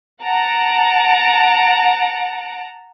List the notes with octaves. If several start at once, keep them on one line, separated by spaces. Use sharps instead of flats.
F#5 A5 A#5 D7